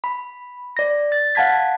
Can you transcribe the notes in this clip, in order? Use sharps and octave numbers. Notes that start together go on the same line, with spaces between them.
B5
D5 A#6
A6
F5 F#5 A5 G#6 B6